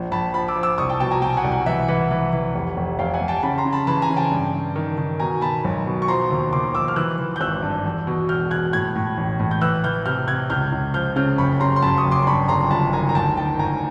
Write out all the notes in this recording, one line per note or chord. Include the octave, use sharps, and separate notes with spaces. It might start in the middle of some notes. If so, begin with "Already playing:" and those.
Already playing: A#1
A#1 A5 B5
F3 A5 B5
D6 E6
F3
D6 E6
C2 C#6 D#6
G5 A5
B2 G5 A5
G#5 A#5
B2 G5 A5
F#5 G#5
C2
F#5 G#5
E3 E5 F#5
E3 E5 F#5
E3
E3
F1
F1
F1 F5 G5
F#5 G#5
F1
G5 A5
C#3 A5 B5
A#5 C6
C#3
A5 B5
E3 A5 B5
G#5 A#5
C#3
G5 A5
G2
G2
D#3
D#3
B2 G#5 A#5
B2 A5 B5
B1
B2
C#6
F3 A#5 C6
D#2
D#2 C6 D6
F3 D6 E6
F6
E3 E6 F#6
E3
G6
G#1 E6 F#6
G2
E2
B2
E1 F6 G6
B2 F#6 G#6
A2 F#6 G#6
A2
A1
A2
G6
E3 E6 F#6
E3 F6 G6
C3 F6 G6
C3 F#6 G#6
C#2 F6 G6
C#2
F3 F6 G6
C#3 F6 G6
F#1 B5 C#6
C#3 A#5 C6
C6
F#2 A5 B5
C#6 D#6
F#1
C6 D6
C6
G2 B5 C#6
G1 A#5 C6
G1 A5 B5
D#3 G#5 A#5
A#5
D2 G5 A5
D#3 G5 A5
D2 G#5 A#5